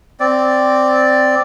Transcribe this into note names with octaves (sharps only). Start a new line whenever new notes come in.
C4 D5